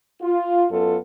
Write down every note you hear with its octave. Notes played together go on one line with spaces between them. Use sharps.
F4
F#2 B3 F4 A4